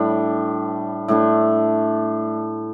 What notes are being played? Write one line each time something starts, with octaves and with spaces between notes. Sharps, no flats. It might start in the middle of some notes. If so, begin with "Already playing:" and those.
Already playing: A2 G3 D4
A2 A3 D4